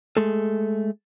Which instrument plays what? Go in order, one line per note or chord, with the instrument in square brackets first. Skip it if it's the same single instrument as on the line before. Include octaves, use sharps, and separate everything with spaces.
[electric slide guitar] G#3 A3 G#4 A4